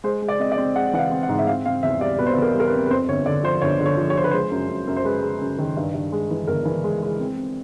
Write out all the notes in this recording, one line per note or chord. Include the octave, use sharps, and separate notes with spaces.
G#3 C5
G#3
D5
C4 D#5
D5
C4
G#3 F#5
E3 F#5
F5
C4
F#5
G#2
E5
C4 F5
C4 F5
E2 E5
G3 D5
B2 B4
C5
B4
E2
A#4
G3
A#4
B4
C4
B4
F2 C5
G1 C#5
D3 D5
F3 C5
G1 C#5
D3
C#5
F3
C#5
F3 C5
B4
G#3 C5
F#2
F#2
F#2
C5
G#3 B4
G#3
F#2
D#3
G2
G2
G#3
E3
G1 A#4
E3
G#3
G#3
C4
C4